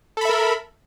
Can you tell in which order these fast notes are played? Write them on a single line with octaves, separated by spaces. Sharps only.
A4 B5 E5 A#4